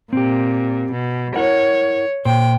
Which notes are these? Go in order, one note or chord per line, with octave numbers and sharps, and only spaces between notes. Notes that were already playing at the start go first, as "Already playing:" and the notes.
A#2 C4 G4
B2
E4 A#4 C#5 F#5
A#2 C5 G5